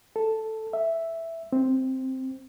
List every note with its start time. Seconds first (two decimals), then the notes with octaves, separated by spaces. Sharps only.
0.16 A4
0.73 E5
1.53 C4